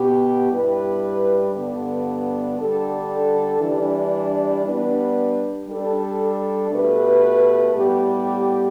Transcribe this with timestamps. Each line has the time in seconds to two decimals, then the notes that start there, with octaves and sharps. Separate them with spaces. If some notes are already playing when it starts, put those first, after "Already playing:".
Already playing: B2 B3 G4
0.51 G2 G3 E4 B4
1.54 G2 D3 B3 D4
2.57 D3 G3 D4 A4
3.61 E3 G3 D4
4.65 G3 B3 D4 B4
5.68 G3 D4 A4
6.72 B2 A3 G4 B4
7.75 A2 G3 B3 G4